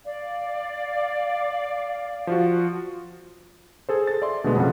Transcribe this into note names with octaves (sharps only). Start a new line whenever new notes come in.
D5 F5
F3 F4 F#4
G#4 A4 C5
A6
D5 E5 C6
B2 D3 G#3 A3 B3
F2 C#3 F#5